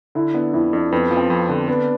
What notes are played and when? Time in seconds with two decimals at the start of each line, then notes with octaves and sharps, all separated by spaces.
0.15 D3 E4
0.34 B3 D4
0.54 F2 E4
0.73 F2 D4
0.92 F2 B3
1.11 F3
1.17 C4
1.30 F2
1.49 D3
1.68 B3 D4